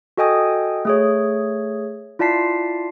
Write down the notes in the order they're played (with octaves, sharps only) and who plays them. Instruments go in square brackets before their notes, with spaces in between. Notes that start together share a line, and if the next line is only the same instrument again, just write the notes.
[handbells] F#4 A4 D#5 G5 G#5 D#6
A3 G#4 C#5
E4 F4 D5 A5 B6 C7